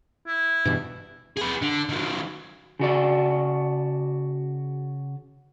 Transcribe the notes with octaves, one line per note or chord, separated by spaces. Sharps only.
E4
G2 B2 E3
G#4 B4
D3
D#3 F#3
C#3 F#4 D5